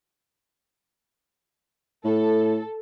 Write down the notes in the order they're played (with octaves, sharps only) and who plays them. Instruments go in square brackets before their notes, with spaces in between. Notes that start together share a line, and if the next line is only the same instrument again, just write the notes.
[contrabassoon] A2 [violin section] A4